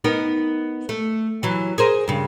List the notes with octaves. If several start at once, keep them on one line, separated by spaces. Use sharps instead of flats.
B3 D#4 A#4
A3
E3 F#3
G#4 A#4 C5
G2 C#3